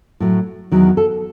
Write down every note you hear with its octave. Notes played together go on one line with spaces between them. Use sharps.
A2 F#3
E2 D#3 F#3
A4